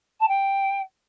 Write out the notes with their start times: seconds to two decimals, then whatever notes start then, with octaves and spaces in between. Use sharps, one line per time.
0.20 A5
0.28 G5